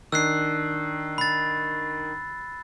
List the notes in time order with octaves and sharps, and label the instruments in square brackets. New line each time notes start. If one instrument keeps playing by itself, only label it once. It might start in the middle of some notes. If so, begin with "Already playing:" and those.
[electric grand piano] D#3 D4 [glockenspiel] E6 F#6 C7
[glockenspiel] B5 A6